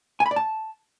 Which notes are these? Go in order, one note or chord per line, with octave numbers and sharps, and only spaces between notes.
G#5
B5
D5
A5